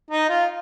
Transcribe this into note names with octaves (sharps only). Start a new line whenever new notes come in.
D#4
F4